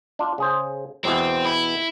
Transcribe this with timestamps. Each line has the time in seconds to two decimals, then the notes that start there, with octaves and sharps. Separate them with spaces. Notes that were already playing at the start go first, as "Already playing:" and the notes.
0.19 D4 F4
0.38 C#3 G#4 C5
1.05 E2 B2 E3 C4
1.46 E4